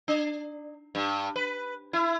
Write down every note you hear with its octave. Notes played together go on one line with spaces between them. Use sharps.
D4
G2
B4
E4